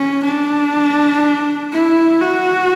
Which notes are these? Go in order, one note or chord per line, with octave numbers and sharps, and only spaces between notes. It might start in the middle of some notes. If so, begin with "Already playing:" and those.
Already playing: C#4
D4
E4
F#4